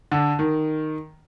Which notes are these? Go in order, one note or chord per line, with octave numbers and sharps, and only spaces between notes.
D3
D#3